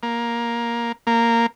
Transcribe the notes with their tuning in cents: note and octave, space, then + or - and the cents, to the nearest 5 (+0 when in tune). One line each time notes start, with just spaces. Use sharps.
A#3 +10
A#3 -10